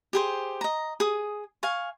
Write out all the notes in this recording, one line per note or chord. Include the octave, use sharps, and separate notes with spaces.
G4 G#4 C5
D#5 A#5
G#4 D#6
F5 G#5 C#6